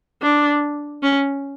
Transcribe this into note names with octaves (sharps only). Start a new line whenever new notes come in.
D4
C#4